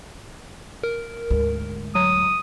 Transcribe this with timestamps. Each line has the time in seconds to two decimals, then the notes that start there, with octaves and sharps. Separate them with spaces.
0.83 A#4
1.31 D2 G#2
1.95 F#3 D#6